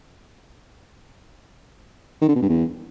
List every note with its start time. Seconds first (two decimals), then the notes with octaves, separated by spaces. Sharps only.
2.22 D#3
2.29 D3
2.36 B2
2.42 G2
2.49 E2